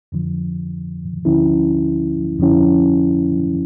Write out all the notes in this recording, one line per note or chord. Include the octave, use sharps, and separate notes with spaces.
F2 D3 F3
D2 D3 F3 C#4 E4
F2 D3 F3 C#4 E4